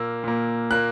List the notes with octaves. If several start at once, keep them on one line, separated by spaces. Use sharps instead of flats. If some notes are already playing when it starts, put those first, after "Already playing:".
Already playing: A#2 A#3 E6
A#2 A#3
A#2 A#3 F#6